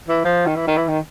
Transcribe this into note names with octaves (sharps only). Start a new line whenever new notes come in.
E3
F3
D#3
E3
D#3
E3
D#3